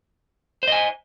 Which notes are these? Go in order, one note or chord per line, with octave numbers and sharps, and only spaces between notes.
C5 D#5 G#5